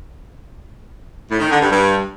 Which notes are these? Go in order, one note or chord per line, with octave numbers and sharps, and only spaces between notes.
A2
D#3
D3
G2
G2